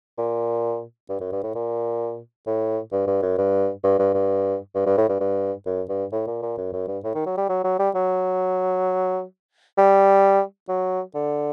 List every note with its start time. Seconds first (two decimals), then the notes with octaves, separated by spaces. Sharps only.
0.18 A#2
1.09 G2
1.20 F#2
1.32 G2
1.43 A2
1.55 A#2
2.47 A2
2.92 G2
3.07 G2
3.22 F#2
3.38 G2
3.84 G2
3.99 G2
4.14 G2
4.75 G2
4.86 G2
4.97 A2
5.09 G2
5.20 G2
5.66 F#2
5.89 G2
6.12 A2
6.27 A#2
6.42 A#2
6.57 F#2
6.73 F#2
6.88 G2
7.04 A2
7.15 D#3
7.26 F#3
7.37 G3
7.49 F#3
7.64 F#3
7.79 G3
7.95 F#3
9.78 G3
10.69 F#3
11.15 D3